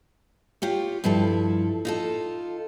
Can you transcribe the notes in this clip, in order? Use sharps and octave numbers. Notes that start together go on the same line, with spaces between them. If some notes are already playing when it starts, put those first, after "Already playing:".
F4 G4 C#5
G2 F3 E4 A4
D#4 F4 A4